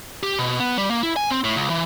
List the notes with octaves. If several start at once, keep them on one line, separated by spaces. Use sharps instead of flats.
G4
B2
B3
G3
A#3
E4
G#5
C4
A2
C#2
E3